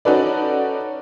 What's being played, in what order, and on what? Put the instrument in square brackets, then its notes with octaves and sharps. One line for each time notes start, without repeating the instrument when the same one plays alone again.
[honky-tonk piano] C#4 D#4 F#4 A4 B4 D5